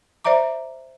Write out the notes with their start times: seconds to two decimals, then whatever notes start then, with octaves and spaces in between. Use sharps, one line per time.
0.24 C5 D5 E5 A#5 D6